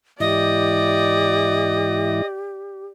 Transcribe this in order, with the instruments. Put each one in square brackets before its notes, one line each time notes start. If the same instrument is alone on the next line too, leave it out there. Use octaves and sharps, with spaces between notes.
[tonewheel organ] G#2 E3 E4 [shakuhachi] G4 [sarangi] D5 [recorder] D#5